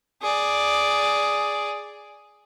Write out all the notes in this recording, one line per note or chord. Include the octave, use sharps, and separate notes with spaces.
G#4 D5